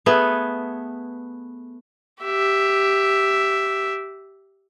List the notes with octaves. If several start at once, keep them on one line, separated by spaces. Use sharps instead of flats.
A3 B3 G#4 B4
G4 E5